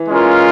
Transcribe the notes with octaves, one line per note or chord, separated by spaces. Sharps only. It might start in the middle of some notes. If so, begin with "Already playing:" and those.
Already playing: E3
G#3 C#4 F4 A#4